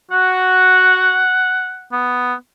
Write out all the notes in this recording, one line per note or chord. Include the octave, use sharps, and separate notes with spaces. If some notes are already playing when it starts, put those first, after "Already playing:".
F#4 F#5
B3